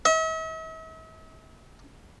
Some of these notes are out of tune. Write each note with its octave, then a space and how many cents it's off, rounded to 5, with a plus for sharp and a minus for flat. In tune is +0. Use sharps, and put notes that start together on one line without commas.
E5 -45